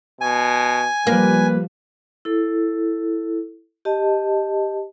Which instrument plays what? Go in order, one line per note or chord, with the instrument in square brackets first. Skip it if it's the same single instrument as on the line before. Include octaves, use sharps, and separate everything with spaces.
[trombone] B2 [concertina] G#5
[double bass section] F3 G3 [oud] A#3 [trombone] B4
[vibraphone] E4 A4
G4 D#5 A5